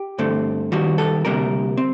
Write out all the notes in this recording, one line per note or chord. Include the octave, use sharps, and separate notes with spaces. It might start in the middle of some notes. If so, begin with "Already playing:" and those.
Already playing: G4
G2 D3 A3 C4
D#2 D#3 G3 F#4
A4
D2 C3 G3 A#3 A#4
C4